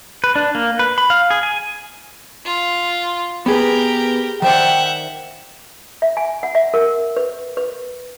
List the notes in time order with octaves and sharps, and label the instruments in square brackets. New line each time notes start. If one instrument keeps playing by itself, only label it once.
[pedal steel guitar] B4
D4
A#3
B4
B5
F5
G#4
G#5
[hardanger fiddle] F4
[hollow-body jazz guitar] B3 G#4 B4 [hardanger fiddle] G4 A#4
[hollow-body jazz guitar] D#3 C5 D5 [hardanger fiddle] E5 F#5 [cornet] G5
[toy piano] E5
G#5
F#5
E5
A#4
B4
B4